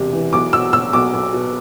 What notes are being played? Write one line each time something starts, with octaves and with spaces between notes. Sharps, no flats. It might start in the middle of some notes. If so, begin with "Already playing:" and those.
Already playing: E1 C3
E3
B1 D6
B2 E6
B2 E6
B1 D6
B1
B2